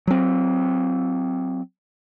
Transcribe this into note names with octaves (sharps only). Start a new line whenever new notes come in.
F#3 C4